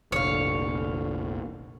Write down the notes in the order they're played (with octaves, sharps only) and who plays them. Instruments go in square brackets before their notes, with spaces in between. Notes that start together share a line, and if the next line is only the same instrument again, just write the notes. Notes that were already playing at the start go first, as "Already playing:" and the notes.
[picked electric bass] F1 A#1 [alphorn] D3 [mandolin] C#5 F5